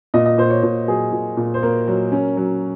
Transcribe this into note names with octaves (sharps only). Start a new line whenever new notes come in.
A#2 D#5
D#5
A#2 C5
C#5
A#2 C5
F#3 G#4
A#2
A#2
C5
A#3 A#4
F#3
C#4
F#3